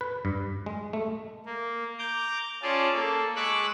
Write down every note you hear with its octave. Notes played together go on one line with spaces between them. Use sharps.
B4
G2
G#3
A3
A#3
A#5 D6 G6
C#4 F4 G#4 D5 A5
A#3 A4
G#3 B5 C#6 D6 E6 F#6